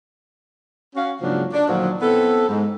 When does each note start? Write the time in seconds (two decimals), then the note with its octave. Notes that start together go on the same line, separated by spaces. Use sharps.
0.96 C#4 F#4 F5
1.21 G#2 C#3 F3 F#3 A#3 D4
1.53 D4
1.68 D2 A#2 D#3 F3 F#3
2.02 B3 C4 E4 A4
2.48 G#2